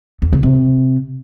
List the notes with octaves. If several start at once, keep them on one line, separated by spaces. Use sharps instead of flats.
E2
C#3
C3